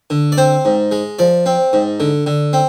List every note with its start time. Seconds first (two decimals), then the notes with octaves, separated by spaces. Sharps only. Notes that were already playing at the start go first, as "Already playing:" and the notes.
0.10 D3
0.32 D5
0.38 C4 C5
0.65 G#2
0.91 G#3
1.19 F3 D5
1.46 C4
1.73 G#2
2.00 D3
2.26 D3
2.53 C4